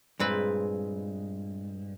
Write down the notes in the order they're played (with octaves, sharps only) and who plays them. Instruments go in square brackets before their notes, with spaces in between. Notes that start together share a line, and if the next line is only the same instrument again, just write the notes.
[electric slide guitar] G2 [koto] A#2 C4 B4 [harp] G#3